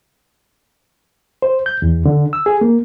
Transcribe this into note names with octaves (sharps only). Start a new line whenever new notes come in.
C5
G6
E2
D3
E6
G#4
A#3